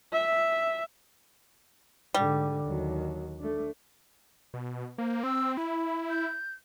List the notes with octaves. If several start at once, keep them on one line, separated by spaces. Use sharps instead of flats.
E5
G#2 D3 G3
D#2 F#3
A3 D4
B2
A#3 C5
C4 E6
E4 B5
G6